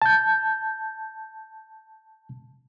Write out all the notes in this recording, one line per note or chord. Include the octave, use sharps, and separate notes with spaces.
A5 G6